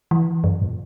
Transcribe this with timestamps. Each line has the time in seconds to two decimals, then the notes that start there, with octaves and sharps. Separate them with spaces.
0.11 E3
0.44 F#2
0.61 A#2